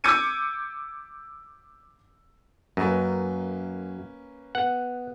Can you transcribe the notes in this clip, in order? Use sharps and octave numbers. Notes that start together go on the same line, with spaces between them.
D6 E6 G6 G#6 C#7 D#7
F#2 A#3 C#4 B4
B3 F#5